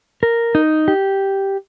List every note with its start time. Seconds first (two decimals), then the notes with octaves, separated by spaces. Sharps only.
0.23 A#4
0.55 D#4
0.88 G4